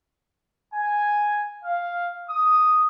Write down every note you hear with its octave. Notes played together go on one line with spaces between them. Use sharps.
G#5
F5
D#6